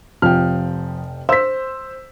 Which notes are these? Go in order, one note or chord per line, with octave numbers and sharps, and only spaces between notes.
F1 F3 G5 F6
C5 E6 B6